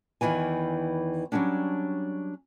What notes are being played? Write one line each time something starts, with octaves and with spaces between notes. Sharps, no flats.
E2 G2 D#3 E3 G#5
F#3 G3 A#3 C#4 D4